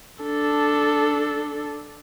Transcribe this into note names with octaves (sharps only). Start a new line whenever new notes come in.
D4 A4